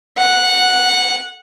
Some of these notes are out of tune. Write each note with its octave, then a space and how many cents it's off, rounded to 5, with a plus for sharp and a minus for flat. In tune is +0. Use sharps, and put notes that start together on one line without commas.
F#5 -10